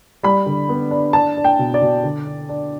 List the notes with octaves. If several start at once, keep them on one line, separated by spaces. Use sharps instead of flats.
G3 B5
D3
B3
D4
D4 A5
D4
G5
B2
D5
B2
D3
D4
D4